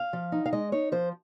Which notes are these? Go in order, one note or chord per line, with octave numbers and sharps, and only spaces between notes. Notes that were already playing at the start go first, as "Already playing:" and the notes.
Already playing: F5
F3
D#4
F5
G#3 D#5
D#4 C#5
F3 C5